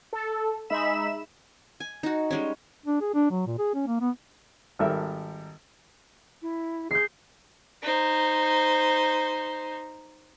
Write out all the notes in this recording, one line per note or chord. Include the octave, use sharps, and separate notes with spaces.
A4
G#3 D#4 E5 B5 E7
G#5
D#4 F#4
G3 G#3 C#4
D4
G#4
D4
F#3
A#2
G#4
C#4
A#3
B3
G#1 G3 A4 A#4 E5
E4
G#4 G6 C7
D#4 C5